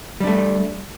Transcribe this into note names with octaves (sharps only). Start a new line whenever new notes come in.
G3 A3 D4